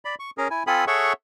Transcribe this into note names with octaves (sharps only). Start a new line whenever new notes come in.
D5 B5
C#6
C#4 G#4 A#4
E4 G#5
C4 F4 A4 G#5 B5 D#6
G#4 A4 C#5 E5 F#5 C#6